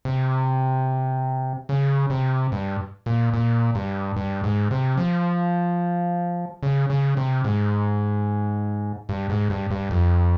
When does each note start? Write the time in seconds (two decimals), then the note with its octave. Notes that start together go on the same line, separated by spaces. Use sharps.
0.05 C3
1.69 C#3
2.10 C3
2.52 G2
3.06 A#2
3.34 A#2
3.75 G2
4.17 G2
4.44 G#2
4.71 C3
4.98 F3
6.63 C#3
6.90 C#3
7.17 C3
7.44 G#2
9.09 G2
9.30 G#2
9.50 G2
9.71 G2
9.91 F2